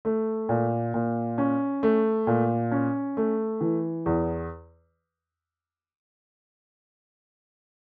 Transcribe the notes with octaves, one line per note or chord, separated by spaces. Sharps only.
A3
A#2
A#2
C#4
A3
A#2
C#4
A3
E3
E2